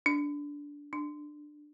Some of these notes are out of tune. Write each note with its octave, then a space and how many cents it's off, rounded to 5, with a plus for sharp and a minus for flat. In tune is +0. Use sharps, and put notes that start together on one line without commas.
D4 -15
D4 +15